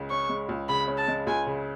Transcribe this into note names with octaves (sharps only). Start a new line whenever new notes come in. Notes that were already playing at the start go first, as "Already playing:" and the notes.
Already playing: C#2 C#3 G#3
C#4 C#6
G#3
C#2
C#3 B5
C#4
A5
G#3
C#2 G#5
C#3